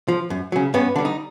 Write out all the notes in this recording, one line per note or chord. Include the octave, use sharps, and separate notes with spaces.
F3
F#2
C#3 F#3
G2 B3 C#4
D3 G3
D#4